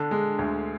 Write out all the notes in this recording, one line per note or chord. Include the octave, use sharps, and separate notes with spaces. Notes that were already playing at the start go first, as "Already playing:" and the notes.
Already playing: D3 D4
G#3
D2